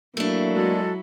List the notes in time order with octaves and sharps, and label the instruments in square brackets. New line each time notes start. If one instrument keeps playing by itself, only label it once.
[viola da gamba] F#3 E4 [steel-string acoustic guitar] A3 D4 [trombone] A#3
[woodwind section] G#3 F#4 A4